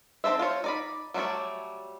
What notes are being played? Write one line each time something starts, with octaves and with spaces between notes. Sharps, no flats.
C4 D#4 A4 C5 E5
F4 C5 C#5
D#4 D5 B5
F#3 G3 A3 C#5 D5